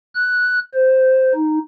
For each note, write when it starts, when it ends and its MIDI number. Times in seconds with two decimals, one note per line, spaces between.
0.15 0.59 90
0.74 1.33 72
1.35 1.59 63